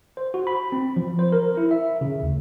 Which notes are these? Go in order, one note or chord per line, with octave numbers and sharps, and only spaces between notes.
C5
F#4
B5
C4
F3
C5
A#4
E4
E5
C#3
D2